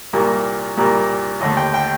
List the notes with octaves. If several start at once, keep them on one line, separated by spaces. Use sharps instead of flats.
C2 A#2 G3 A#3
C2 A#2 G3 A#3
D#2 D3 A3 D#5
G5
G5